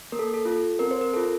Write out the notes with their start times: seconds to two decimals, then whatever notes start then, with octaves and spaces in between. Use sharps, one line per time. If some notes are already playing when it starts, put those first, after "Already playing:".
0.12 A#3 A#4
0.19 A4
0.34 A4
0.45 F4 A4
0.79 C4 A#4
0.91 C5
1.01 A#4
1.13 F4 A4